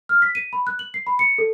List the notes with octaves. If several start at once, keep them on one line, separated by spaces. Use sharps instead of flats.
F6
B6
D#7
B5
F#6
F#7
C7
B5
C#7
A4